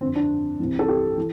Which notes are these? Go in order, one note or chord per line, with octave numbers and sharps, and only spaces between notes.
F2 D3 C4
D4
C2 C3 E3
A4
G4
E3